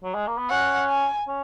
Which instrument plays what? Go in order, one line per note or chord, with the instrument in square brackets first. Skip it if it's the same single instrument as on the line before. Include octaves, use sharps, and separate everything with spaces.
[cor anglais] F#3
G#3
A#3
B3
[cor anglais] C#4 [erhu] F#5
[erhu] G#5
[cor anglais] C#4